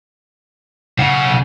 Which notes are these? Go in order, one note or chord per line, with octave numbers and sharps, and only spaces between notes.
B1 C#3 F#5